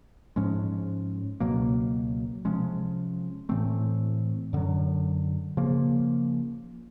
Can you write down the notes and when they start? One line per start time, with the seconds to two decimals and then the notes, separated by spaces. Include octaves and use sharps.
0.36 G#2 F3 G#3 C#4
1.40 C#2 B2 F#3 A#3
2.45 C3 F3 G#3 C#4
3.49 A2 E3 A3 C4
4.53 F#2 D3 F#3
5.57 C#3 F3 A#3